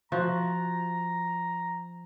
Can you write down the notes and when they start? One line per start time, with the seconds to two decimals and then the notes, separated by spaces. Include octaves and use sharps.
0.12 F3 F#4 A#5